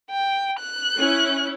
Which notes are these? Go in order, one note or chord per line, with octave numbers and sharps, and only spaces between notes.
G5
F#6
C#4 E4